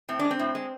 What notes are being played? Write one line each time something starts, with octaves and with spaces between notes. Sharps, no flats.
A2 C4
G#3 D4
C4
A2
G#3